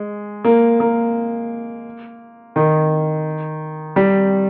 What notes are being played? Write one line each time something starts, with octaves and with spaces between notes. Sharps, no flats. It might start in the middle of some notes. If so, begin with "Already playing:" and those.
Already playing: G#3
A#3
A#3
D#3
G3